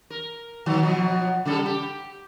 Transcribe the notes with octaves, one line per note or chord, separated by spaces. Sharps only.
A#4
B2 D#3 F#3
B2 F3 F#3
C#3 G3 A4
G4